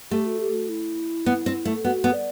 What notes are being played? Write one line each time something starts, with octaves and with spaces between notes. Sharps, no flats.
A3 G4
F#4
G4
F#4
E4
B3
C4
A3
B3 F#4
B3
D5